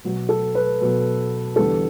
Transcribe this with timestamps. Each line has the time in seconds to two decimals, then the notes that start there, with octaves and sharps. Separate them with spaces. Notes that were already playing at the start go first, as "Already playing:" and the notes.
0.04 B2 F#3 B3
0.29 A4
0.55 B4
0.81 B2 F#3 B3
1.56 E2 D3 G3 B3 A4